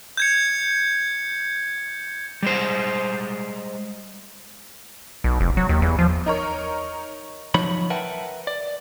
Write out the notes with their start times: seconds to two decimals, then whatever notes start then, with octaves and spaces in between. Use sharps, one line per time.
0.17 G6 G#6 C#7
2.43 G3 G#3 C5
5.24 B1
5.40 F1
5.57 F#3
5.69 D#2
5.82 E2
5.99 F3
6.26 D#4 A#4 C#5
7.54 F3 F#3 D#4 C#5 B5
7.90 A#4 B4 E5 F#5 G5 A5
8.47 D5